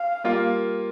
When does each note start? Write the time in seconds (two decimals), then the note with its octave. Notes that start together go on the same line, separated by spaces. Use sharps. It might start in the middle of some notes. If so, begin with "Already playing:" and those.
Already playing: F5
0.24 G3 A#3 F4